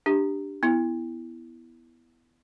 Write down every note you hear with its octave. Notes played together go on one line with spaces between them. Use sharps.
D4 G4
B3 E4